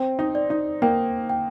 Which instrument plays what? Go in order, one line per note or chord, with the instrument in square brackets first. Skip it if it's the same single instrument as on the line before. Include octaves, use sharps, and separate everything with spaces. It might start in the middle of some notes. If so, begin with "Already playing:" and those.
Already playing: [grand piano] C4 [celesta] G5
[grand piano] D#4
[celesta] D5
[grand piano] D#4
[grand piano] A#3 [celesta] G5
[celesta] G5